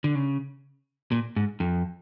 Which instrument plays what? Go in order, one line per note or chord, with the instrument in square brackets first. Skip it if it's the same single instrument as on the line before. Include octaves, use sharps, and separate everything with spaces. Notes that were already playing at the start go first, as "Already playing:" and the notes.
[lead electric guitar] D3
C#3
A#2
G#2
F2